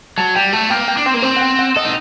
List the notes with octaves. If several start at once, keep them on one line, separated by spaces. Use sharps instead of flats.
F#3 A5
G3 G5
A3 A5
A#3 G5
G5
D4
C4 G5
A#3
C4 C5
F#5
G5
F#5
A4 D#5
D#4